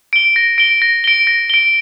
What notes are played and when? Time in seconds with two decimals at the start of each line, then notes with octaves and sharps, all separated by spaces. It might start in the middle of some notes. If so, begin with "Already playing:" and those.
0.13 D7 G7
0.36 A#6
0.58 D7 G7
0.82 A#6
1.04 D7 G7
1.27 A#6
1.50 D7 G7